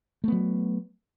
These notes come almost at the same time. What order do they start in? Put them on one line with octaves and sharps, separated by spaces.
A3 B3 F#3